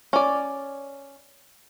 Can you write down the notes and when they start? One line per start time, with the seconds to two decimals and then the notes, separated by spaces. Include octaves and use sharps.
0.13 C#4 D5